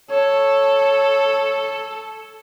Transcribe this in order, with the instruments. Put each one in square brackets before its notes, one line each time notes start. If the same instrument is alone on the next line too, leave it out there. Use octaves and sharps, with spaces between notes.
[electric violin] A4 [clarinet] C#5